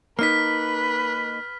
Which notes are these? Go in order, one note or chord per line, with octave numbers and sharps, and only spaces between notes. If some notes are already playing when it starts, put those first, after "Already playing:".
A#3 D#4 B4 F6 B6